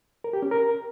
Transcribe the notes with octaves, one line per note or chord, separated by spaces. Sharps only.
A#4
G4
C#4
A#4